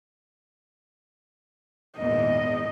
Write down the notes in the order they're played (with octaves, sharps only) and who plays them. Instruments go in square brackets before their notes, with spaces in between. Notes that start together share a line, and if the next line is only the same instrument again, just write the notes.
[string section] G#1 E2 A#2 [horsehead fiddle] D#5